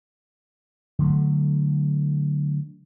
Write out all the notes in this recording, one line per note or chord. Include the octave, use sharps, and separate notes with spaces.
D3 F#3 A3